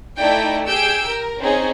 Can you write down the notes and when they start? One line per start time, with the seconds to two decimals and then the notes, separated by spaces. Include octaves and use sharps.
0.18 A3 D#4 E4 D5 G5
0.67 G4 G#4 E6 G6 D7
1.06 A#4
1.41 C4 C#4 D#4 G#4